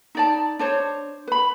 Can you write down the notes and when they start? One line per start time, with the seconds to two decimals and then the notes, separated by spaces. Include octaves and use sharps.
0.15 D#4 D5 A5
0.59 D4 C5 C#5
1.27 B4 B5